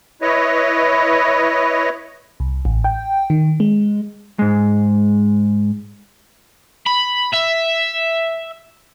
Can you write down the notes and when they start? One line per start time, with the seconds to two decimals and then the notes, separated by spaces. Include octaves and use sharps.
0.22 E4 B4 C#5 D#5
2.40 C2
2.65 A1
2.84 G5
3.30 D#3
3.60 G#3
4.39 G#2 G#3
6.87 B5
7.34 E5